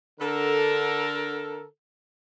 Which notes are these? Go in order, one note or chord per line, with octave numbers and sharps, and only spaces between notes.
D3 A4 A#4